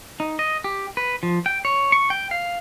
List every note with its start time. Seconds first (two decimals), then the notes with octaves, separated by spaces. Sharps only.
0.20 D#4
0.39 D#5
0.64 G4
0.97 B4
1.23 F3
1.46 G5
1.65 C#5
1.92 C#6
2.10 G5
2.31 F5